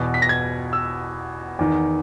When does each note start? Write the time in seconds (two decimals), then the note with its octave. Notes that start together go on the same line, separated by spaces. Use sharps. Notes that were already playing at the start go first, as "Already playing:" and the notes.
Already playing: E2 B2
0.14 B6
0.22 A#6
0.29 G#6
0.73 E6
1.59 E2 D#3